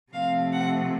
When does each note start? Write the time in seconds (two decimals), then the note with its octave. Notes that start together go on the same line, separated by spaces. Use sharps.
0.13 C3 F3 A3 C4 F5
0.53 F#5